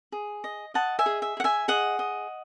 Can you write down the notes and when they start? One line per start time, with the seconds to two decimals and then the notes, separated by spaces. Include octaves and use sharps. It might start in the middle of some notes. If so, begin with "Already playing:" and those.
0.12 G#4
0.44 D#5
0.74 D#5 F#5 A5
0.99 E5 G#5
1.06 G#4
1.22 E5
1.37 G#4 F#5
1.44 E5 G#5
1.68 G#4 D#5 F#5
1.99 D#5